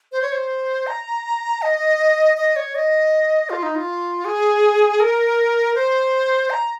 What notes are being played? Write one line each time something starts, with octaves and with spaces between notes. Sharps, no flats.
C5
C#5
C5
A#5
D#5
D#5
C#5
D#5
F4
D#4
F4
G#4
A#4
C5
A#5